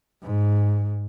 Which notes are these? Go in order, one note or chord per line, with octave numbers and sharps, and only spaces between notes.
G#2